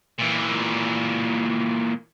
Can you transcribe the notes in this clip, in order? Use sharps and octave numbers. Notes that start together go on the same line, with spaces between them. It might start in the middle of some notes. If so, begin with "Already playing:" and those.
A#2 E3